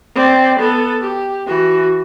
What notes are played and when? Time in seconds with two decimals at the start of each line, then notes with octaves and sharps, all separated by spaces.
0.16 C4 D5
0.59 B3 A4
1.01 G4
1.47 E3 F#4